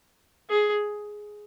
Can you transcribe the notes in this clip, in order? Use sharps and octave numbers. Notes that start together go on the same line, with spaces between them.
G#4